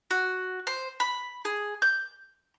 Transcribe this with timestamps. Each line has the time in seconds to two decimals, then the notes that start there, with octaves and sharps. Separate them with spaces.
0.11 F#4
0.67 C5
1.00 B5
1.45 G#4
1.82 G6